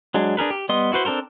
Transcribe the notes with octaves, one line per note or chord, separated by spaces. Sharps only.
F#3 G#3 D4
D4 G#4 A#4 B4
G4
G3 B3 D#5 C6 D#6
E4 F#4 B4 C5
C4 D4 A4 A#4 C5